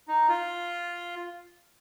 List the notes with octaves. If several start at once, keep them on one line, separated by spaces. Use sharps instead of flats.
D#4
F4